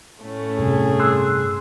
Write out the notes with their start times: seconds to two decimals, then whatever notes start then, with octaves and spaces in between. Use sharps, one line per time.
0.21 A2 A3 C#4
0.59 G2 C3 G#4
0.99 C6 E6 F#6